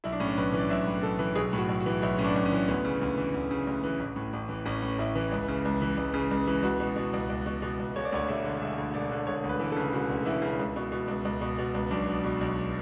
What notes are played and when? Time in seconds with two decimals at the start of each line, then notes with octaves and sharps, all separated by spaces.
0.04 B1 E4
0.12 D4
0.20 A2 C#4
0.28 D4
0.37 B1 B4
0.53 E3
0.59 D5
0.70 B1 E5
0.87 A2
1.03 B1 A4
1.19 E3
1.36 B1 G#4
1.53 A2
1.58 F#4
1.69 B1
1.81 F#4
1.86 E3
2.02 B1 E4
2.19 A2 C#4
2.24 D4
2.36 B1
2.45 C#4
2.52 E3
2.68 D2 B3
2.85 C#3
3.01 D2
3.18 E3
3.34 D2
3.51 C#3
3.67 D2
3.84 E3
4.00 A1
4.16 A2
4.33 A1
4.49 E3
4.66 A1 C#4
4.82 A2
4.99 A1 E4
5.16 E3
5.32 C#2
5.48 C#3
5.65 C#2
5.82 E3
5.97 C#2
6.14 C#3
6.31 C#2
6.48 E3
6.63 C#2 F#4
6.80 B2
6.96 B2
7.13 C#2
7.29 C#2
7.46 B2
7.62 B2
7.79 C#2
7.96 E1 C#5
8.05 D5
8.12 D2 C#5
8.29 E1 E5
8.45 D3
8.61 E1 E5
8.78 D2
8.94 E1 D5
9.11 D3
9.27 E1 C#5
9.44 D2
9.49 B4
9.60 E3
9.72 A4
9.76 C#3
9.93 E1 F#4
10.09 D2
10.26 E3 E4
10.42 C#3
10.59 C#2
10.76 B2
10.92 B2
11.08 C#2
11.25 C#2
11.41 B2
11.58 B2
11.74 C#2
11.91 B1 D4
12.07 B2
12.24 B2
12.41 B1